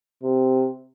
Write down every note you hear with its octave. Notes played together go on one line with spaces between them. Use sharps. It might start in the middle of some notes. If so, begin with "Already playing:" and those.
C3